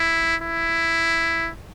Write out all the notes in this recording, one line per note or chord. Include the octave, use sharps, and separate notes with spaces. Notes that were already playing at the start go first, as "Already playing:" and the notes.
Already playing: E4
E4